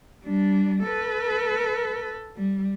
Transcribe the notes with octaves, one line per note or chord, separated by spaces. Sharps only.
G3 D4
A4 B4
G3